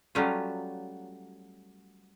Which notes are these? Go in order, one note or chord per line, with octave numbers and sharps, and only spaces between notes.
F#3 G3 A3 C#4 F4